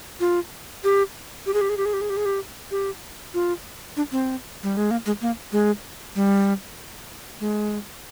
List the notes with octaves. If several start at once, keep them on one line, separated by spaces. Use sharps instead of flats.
F4
G4
G4
G#4
G4
G#4
G4
G#4
G4
G#4
G4
G#4
G4
G4
F4
D4
C4
G3
G#3
A#3
G#3
A#3
G#3
G3
G#3